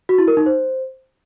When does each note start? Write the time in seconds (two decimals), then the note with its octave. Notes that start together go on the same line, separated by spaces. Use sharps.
0.09 F#4
0.18 E4
0.28 A#4
0.37 D#4
0.46 C5